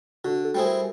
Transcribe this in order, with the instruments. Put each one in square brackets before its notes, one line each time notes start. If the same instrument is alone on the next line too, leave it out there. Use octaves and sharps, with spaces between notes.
[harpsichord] D3 [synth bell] F#4
[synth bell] A4
[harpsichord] G3 C4 E4 G#4
[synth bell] A#4